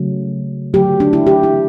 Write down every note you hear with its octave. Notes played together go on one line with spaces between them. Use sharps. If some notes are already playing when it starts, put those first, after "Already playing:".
Already playing: C#3 F#3 A3
D3 F#3 A3 G4
D4
E4
G4
E4